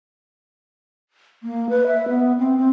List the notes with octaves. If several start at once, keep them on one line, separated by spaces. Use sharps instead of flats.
A#3
B4
E5
B3
C4
C4